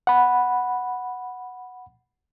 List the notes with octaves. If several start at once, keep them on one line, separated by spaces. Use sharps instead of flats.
F#5 B5